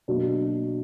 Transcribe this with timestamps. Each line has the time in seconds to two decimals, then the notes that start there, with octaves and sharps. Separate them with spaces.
0.08 B2 F#3 A#3 D4